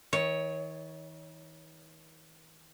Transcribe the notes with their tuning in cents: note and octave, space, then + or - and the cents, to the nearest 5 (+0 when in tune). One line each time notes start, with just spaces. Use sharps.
D#3 +45 C#5 +5